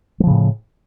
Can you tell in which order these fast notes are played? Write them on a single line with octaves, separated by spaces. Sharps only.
G3 F3 C#3 A2